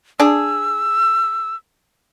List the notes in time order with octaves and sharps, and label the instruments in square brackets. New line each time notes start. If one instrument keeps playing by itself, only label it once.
[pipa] D4 G#4 [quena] E6